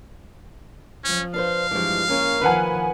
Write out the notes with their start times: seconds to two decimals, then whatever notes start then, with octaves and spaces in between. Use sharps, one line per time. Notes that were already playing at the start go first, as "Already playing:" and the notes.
1.05 F3 C#4
1.34 D4 B4 C5 F5
1.71 G2 E3 F3 G#3
2.08 A#3 C#4 A#4
2.41 D#3 F3 B4 F#5 G#5